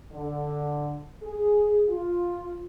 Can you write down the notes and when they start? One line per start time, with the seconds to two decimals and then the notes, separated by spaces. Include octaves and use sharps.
0.12 D3
1.23 G#4
1.88 F4